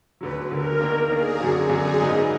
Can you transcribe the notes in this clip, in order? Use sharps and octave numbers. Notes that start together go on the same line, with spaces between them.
D2 D3 F#3 B4
D2 D3 F#3 A#4
D#3 A#3 D4 A#4
D#3 A#3 D4 G#4
F#2 D3 F#3 D4 F#4
F#2 D3 F#3 D4 G#4
G#2 F#3 A#3 D#4 B4